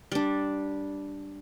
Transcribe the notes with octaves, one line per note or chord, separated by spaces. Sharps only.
G3 D4